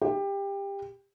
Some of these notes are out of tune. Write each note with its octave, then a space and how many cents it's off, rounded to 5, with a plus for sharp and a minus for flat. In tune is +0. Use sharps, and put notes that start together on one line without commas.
G4 +20